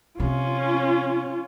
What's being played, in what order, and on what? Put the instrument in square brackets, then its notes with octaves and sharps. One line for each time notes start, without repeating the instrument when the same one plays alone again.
[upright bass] C3 [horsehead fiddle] C#4 F4